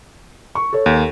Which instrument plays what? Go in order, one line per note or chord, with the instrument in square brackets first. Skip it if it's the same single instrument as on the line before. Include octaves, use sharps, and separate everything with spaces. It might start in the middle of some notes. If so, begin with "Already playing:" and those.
[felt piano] C#6
A4 C#5
[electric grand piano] D#2